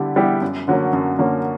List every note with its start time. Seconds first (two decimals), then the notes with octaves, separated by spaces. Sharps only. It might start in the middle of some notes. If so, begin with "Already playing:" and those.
Already playing: D3 G3 B3 E4 G4
0.16 G3 B3 E4 G4
0.42 F#2
0.68 D3 F#3 A#3 C#4
0.93 F#2
1.19 D3 F#3 A#3 C#4